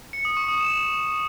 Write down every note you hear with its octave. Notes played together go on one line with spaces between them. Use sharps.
C#7
D#6
C#6
D#6
E7